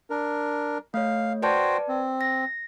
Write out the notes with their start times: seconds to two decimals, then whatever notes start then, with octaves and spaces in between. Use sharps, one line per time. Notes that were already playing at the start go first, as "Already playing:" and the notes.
0.10 D4 A#4
0.94 A3 C#5 F5
1.42 F#4 B4 C5 D5 G5 A5
1.88 C4
2.21 A#6